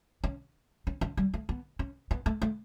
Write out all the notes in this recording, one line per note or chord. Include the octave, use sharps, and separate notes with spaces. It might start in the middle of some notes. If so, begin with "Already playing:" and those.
C#4
C#4
C#4
G3
A3
B3
C#4
B3
A3
A3